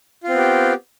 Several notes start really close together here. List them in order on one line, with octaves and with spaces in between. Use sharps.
F4 C4 B3 G4